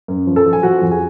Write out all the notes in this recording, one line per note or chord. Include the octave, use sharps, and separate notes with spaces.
F#2
F3
A4 A5
F3
G#5
F3 F#4 F#5
F2
G#4 G#5